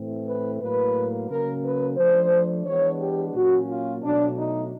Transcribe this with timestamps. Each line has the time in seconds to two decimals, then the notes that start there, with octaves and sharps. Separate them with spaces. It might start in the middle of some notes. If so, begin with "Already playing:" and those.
Already playing: A2 E3 A3 C4
0.27 B4
0.60 A2 F#3 A#3 B4
1.29 C#3 F#3 A#3 C#4 A#4
1.64 B4
1.97 F3 A3 D4 C5
2.66 E3 G#3 B3 D4 C#5
3.00 G4
3.35 A#2 F#3 A#3 C#4 F#4
3.69 F4
4.03 B2 F#3 A3 D4
4.38 D#4